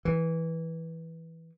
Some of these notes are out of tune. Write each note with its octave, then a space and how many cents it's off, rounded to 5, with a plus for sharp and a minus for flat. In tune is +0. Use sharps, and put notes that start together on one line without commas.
E3 -10